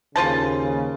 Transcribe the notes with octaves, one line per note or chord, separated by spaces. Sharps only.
D#2 C#3 F4 C5 A5